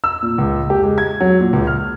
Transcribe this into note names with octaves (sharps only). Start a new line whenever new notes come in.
E6
A#2
C#2
G4
G#3
G#6
F#3
A#2
C#2
F6